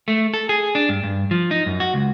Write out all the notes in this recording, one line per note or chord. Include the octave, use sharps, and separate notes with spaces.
A3
A4
G#4
D4
G2
G2
F3
D#4
F#2
F#4
C#2